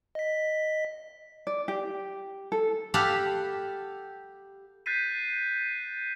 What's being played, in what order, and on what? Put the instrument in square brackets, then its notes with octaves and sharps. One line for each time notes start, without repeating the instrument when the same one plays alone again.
[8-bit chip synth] D#5 B6
[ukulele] D5
G4
A4
[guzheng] G4 A4 F5 F#5 B5
[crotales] F#6 G6 A6 B6 C7 D#7